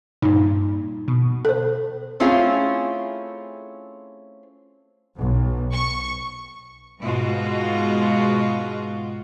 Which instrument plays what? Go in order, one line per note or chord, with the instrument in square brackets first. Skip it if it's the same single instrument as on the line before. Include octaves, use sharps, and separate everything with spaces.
[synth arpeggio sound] G2 A#2 [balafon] D#4
[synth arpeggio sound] B2
[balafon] A4 C5
[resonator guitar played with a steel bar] A3 C4 C#4 E4 F4 G#4
[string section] B1
C#6
[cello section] G#2 B2 G#3 F4 F#4